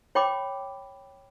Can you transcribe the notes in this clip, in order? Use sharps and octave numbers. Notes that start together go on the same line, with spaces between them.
C#5 G5 B5 D6